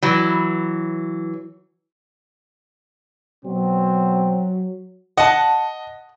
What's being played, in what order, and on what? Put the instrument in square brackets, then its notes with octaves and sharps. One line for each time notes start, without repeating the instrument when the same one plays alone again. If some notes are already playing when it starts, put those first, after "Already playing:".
[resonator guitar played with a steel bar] E3 F#3
[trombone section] B2 C4 [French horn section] F#3
[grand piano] D#5 [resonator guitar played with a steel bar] F#5 A5